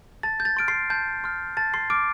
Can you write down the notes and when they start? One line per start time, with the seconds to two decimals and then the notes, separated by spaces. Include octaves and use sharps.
0.23 A5 A6
0.40 G6
0.45 A6
0.57 C6 F6 D7
0.68 C6 C7
0.90 A5 G6
1.24 C6 F6
1.57 A5 A6
1.74 C6 C7
1.90 D6 F6 D7